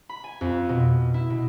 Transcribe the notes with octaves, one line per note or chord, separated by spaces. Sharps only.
B5
G#5
F2
B2
E4
B2